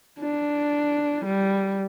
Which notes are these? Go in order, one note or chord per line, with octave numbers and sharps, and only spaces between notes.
D4
G3